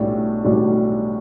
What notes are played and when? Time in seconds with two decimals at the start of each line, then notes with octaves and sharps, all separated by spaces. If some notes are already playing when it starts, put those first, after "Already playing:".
Already playing: B1 A2 G3 D4
0.44 B1 A2 G3 D4